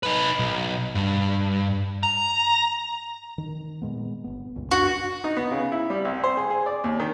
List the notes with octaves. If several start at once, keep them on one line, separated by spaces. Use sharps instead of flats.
D#4 B4
B1
G2
A#5
D#3
A#2 G#3 B3
G1 B3
C#2 G2 A#2
C#2 F#2 D4 F#4
D#4
B3
C#3
E4
G3
C2
C5
G#4
G#4
D5
D#2
D#3